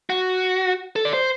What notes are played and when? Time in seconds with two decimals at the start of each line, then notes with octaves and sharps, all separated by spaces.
0.10 F#4
0.96 A4
1.05 D5
1.14 C5